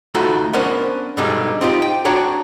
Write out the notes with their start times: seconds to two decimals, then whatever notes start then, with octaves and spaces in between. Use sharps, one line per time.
0.14 D2 A3 D#4 F4 F#4 B5
0.53 B3 C#4 D4 A#4 C5
1.17 G2 B2 D3 G3 G#3 D#4
1.61 C4 D#4 F4 G4
1.82 G5
2.05 D4 F#4 C#5 D5 G5 A#5